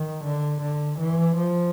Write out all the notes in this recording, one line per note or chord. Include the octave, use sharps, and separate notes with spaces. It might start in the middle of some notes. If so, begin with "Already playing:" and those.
Already playing: D#3
D3
D3
E3
F3